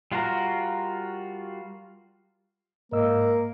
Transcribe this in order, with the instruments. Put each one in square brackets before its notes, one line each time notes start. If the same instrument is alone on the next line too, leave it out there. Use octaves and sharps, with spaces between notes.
[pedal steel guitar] G3 F4 F#4 A#4 A#5
[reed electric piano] G#2 D#5 E6 [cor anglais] A#3 [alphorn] A#4